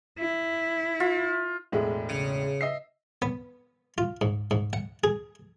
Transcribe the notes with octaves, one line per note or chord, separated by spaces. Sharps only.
E4
F4
E1 A2 G#3
C#3
D#5 E5 C7
B3
F4
G#2
G#2
F#5
G#4